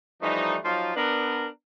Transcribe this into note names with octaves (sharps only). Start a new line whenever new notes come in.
E3 F3 G3 A3 D#4
F3 F#3 D#4 F4
B3 D4 A#4